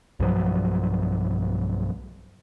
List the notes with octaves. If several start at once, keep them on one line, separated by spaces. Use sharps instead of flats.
B1 G2 F3 F#3